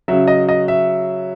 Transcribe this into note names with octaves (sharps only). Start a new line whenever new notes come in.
C#3 F#3 E5
D#5
D#5
E5